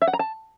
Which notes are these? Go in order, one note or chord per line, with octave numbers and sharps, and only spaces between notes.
E5
F#5
A#5
A5